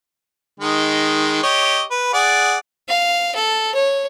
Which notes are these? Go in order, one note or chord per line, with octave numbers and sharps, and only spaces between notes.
D#3 G#3
G4 C#5 D#5
B4
G#4 D5 F#5
F5
A4
C#5